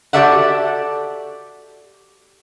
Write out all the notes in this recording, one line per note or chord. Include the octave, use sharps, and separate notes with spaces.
F#4 G4 A4 D5 E5 F#5